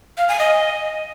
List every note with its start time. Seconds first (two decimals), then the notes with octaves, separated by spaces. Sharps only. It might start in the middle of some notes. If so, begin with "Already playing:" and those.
0.18 F5
0.28 G#5
0.39 D#5